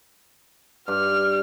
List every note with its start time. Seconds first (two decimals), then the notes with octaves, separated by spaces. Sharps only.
0.88 G2 F6